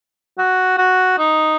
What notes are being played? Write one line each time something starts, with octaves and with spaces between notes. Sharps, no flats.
F#4
F#4
D#4